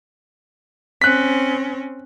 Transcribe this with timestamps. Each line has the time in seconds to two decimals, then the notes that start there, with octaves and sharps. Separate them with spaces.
1.02 C4 C#4 F#6 B6